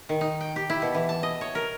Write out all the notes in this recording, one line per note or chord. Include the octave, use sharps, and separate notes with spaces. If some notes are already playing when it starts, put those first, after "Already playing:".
D#3
D#4
G5
G4
E4
B2
E3
A5
D#5
C#5
A#4